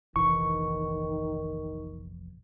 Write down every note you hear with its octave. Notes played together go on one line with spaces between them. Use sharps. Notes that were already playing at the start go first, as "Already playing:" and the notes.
F1 A#1 D#3 E3 C#6